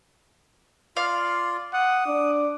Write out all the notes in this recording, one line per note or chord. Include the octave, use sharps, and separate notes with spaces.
F4 D5 F5
F#5 D#6
D4 D6